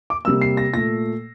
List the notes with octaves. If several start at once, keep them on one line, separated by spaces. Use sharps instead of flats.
D6
C3 G3 A#3 E6
C7
A#6
A#2 A3 A#6